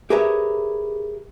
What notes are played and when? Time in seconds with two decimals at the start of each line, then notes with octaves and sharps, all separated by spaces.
0.10 G4 G#4 A#4 B4 C#5 E5